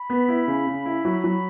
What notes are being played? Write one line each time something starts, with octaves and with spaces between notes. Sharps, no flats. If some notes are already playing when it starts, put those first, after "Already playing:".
Already playing: B5
B3
E4
C#3
C#3
E4
F#3
F#3